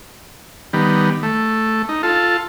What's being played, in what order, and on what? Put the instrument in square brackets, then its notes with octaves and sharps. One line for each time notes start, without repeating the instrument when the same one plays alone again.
[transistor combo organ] D#3 G3 B3
A3
D#4
F4 A4